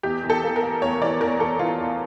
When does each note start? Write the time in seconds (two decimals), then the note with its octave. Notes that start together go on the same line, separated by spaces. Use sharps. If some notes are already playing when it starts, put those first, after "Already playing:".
0.03 E2 G4
0.24 E2
0.30 A4
0.43 A#3
0.56 A#4
0.63 A#3
0.82 E2 C#5
1.01 E3 D5
1.20 E2 A#4
1.40 E2 A4
1.59 E3 F4
1.80 E2